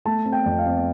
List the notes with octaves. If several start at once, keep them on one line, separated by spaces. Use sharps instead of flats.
A3 A5
C4
G5
F2
F5
C4